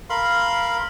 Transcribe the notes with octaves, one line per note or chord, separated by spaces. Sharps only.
A#4 F5 B5 C6